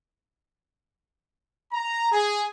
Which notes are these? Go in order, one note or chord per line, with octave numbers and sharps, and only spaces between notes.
A#5
G#4